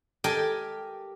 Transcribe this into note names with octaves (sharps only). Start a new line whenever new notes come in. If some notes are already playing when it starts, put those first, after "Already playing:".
G4 A4 A#4 D#5 G5 G#5